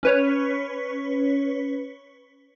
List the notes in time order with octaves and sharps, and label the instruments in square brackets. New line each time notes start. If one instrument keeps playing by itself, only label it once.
[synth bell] C#4 B4 C#5